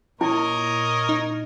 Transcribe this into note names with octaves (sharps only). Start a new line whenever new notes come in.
A#2 E4 A#4 C#5 D#5
D#4